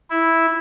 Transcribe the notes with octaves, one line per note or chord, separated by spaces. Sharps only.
E4